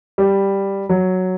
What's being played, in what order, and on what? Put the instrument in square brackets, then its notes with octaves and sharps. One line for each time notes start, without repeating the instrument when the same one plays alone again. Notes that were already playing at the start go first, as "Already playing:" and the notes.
[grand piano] G3
F#3